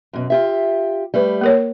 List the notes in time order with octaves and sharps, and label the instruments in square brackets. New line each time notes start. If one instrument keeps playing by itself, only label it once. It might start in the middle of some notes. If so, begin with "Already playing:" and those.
[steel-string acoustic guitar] F#2 B2
F4 G4 E5
G3 A3 B4
[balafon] A#3 A#4 C#5